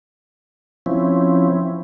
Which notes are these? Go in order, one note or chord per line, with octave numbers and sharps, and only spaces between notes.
F3 C4 C#4 E4